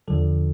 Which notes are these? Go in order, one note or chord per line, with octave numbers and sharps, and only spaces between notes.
E2 D3 F3 A4